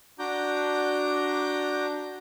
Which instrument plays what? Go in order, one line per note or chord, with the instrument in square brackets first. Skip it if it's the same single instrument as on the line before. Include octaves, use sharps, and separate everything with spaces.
[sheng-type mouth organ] D4 F#4 A#5 D6 G6